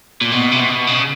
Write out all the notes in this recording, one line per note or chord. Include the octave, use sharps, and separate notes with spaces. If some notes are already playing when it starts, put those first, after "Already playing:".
A#2
B2
C3
B2
C#3